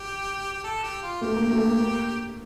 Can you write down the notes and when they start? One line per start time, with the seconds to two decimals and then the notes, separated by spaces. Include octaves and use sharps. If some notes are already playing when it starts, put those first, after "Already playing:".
Already playing: G4
0.53 G4
0.64 A4
0.84 G4
1.03 F4
1.21 A3 G4
1.36 A#3
1.51 A3
1.65 A#3
1.80 A#3